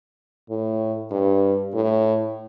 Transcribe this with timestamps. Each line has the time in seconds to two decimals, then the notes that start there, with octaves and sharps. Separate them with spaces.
0.50 A2
1.11 G2
1.74 A2